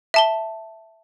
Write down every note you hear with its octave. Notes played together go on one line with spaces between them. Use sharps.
E5 A5 G7